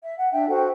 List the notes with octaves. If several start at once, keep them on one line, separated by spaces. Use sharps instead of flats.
E5
F#5
D4 E5 G5
F#4 A4 C5 F#5
G5